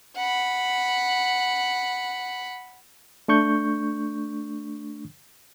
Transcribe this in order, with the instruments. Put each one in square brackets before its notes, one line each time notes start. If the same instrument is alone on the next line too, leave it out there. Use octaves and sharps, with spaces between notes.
[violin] F#5 B5
[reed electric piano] A3 D4 C#6 G6